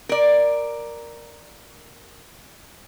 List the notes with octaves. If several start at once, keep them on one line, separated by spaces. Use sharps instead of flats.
A#4 D5